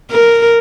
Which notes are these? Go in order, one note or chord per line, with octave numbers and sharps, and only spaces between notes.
A#4